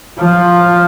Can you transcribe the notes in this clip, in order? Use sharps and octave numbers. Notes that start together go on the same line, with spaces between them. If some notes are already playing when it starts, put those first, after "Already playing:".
F3